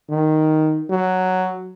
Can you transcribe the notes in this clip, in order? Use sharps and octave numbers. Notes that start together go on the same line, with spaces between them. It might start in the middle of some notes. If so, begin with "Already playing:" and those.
D#3
F#3